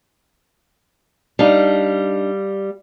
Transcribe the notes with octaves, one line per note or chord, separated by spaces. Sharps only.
G3 D4 D#4 F5